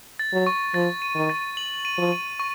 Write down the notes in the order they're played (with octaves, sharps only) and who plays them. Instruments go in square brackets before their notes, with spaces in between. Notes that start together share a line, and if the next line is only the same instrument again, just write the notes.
[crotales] A6
[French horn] F#3
[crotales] C#6
[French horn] F3 [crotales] A6
[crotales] D#7
[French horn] D#3
[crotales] A6
F#7
D#7
[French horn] F3
[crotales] D#7
C#6